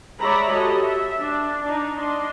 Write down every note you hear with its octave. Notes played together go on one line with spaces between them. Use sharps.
G#3 C#5 D5 E5 A#5 B5
F#4 G4 A4 C#5 D#5
E5
D4
D4 D#4
D4 D#5 C6